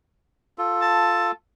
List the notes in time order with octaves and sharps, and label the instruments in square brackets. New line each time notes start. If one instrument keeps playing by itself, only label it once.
[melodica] F4 A4
[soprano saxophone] A5